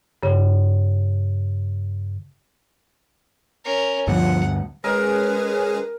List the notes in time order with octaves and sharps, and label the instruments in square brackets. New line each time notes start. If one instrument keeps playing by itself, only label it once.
[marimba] G2 C#3
[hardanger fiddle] C#4 A#4
[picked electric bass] D2 G2 B2 [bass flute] F3 [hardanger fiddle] F#5
[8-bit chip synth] G#3 C#4 G#4 [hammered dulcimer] A#4 [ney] B4